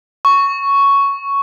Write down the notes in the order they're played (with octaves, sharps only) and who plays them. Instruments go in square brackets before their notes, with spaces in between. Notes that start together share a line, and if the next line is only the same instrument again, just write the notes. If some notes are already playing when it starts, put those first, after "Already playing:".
[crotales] C#6